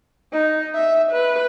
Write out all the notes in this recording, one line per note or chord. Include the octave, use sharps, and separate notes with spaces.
D#4
E5
B4